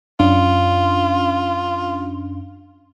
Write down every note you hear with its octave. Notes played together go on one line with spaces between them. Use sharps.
F#2 C#4 D4 F4